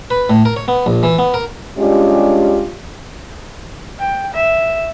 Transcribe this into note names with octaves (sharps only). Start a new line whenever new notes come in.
B4
A2
A#4
C#5
B3
A#1
E3
B3
A#4
G3 G#3 C#4 D4 F4 G4
G5
E5